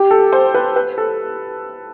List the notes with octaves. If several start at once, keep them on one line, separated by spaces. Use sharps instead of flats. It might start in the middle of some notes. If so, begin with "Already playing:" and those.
Already playing: G4
A4
C5
B4
B4
A4